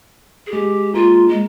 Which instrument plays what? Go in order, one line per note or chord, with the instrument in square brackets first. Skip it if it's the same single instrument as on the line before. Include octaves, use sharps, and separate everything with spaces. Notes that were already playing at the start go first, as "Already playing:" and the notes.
[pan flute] G#4
[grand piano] G#3 [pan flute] G4
[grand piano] A#3 [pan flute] F4
[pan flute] G#3